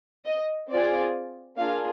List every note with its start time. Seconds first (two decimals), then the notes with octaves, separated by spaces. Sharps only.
0.26 D#5
0.70 C4 F4 G#4 D5
1.57 A#3 D4 F4 G#4 F5